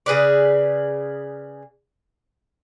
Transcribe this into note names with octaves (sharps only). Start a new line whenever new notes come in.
C#3 G#4 B4 D5